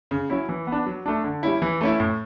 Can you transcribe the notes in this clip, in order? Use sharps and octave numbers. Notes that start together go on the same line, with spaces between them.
C#3
F#3 C#4 E4
E3
B3
D4
F#3
A3 D4
D3
G3 C#4 E4
E3
A3 C#4 E4
A2